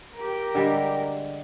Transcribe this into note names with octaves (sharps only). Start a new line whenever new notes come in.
G4 A#4
D3 G3 G#3